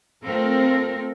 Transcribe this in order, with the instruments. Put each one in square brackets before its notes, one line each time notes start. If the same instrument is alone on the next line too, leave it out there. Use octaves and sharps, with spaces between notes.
[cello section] A3 C4 F4 A4 A#4